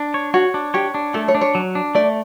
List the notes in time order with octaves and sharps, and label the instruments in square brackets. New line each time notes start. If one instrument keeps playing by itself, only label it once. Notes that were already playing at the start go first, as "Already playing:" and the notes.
Already playing: [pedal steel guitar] D4
C#5
[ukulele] F#4 [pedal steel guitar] C#5
[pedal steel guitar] D4
[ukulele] G4 [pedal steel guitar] C#5
[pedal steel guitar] D4
[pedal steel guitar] A3 [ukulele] A4
[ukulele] C#5
[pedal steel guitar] D4
[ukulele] C#5
[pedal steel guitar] F#3
D4
[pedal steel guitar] A3 [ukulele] D5